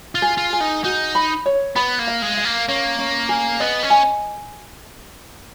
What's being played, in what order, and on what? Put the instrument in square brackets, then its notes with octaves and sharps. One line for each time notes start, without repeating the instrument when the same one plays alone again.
[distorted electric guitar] F4
[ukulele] G#4
[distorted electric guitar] F4
[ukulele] G#4
[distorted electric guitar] D#4
[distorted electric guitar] D#4 [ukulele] F#4
[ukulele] B5
C#5
[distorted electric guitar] B3 [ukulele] B5
[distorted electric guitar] A#3
[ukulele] F5
[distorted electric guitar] G#3
[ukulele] F5
[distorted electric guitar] A#3
[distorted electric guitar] A#3 [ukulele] C#4
[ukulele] C#4
G#4
[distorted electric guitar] B3 [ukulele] D#5
[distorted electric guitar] C#4
[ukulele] G#5